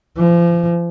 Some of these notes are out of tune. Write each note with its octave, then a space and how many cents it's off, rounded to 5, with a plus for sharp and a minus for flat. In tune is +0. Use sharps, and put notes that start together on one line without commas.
F3 -35